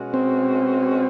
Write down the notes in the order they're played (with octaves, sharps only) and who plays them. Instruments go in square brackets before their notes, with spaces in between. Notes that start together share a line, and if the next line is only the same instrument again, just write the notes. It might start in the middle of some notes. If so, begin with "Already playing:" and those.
Already playing: [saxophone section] B2 G#3 C#4 F#4
[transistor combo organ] C4